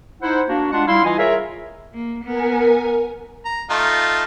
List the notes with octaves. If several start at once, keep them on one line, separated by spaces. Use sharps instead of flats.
D#4 E4 C5 F#5
A#3 D4 F#4
G#3 D4 F4 F#5
G3 E4 F5 C6
E3 E4 F4 D#5 G#5
F4 G#4 A#4 C#5 E5
A#3
B3 A#4 G#5
A#5
A3 D#4 F4